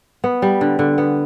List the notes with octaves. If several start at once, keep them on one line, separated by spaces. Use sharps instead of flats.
B3
G3
D3
D3
B3